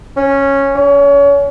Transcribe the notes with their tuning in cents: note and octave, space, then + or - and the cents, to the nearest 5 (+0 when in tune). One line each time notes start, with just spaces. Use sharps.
C#4 -5
C#4 +35